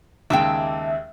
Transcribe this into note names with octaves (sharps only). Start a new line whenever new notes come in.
D#2 C#3 G#3 E5 G5 A5 D6